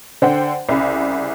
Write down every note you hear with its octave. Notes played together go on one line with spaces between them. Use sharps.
D3 C5 F#5 G5
C2 C#3 B5